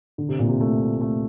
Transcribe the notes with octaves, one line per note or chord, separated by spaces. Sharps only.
D3
C3
A#2
C3
A3
A3